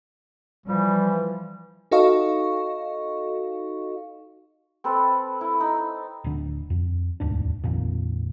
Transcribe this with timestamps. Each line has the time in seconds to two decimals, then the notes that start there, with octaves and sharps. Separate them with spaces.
0.66 E3 F3 G3
1.91 D#4 F#4 A4 D#5 F5 C#6
4.84 C4 A4 B4
5.41 E4
5.60 D#4
6.24 D1 D3
6.70 F2
7.20 E1 D2 G#2 D4
7.64 A#1 F2 A#2 D#3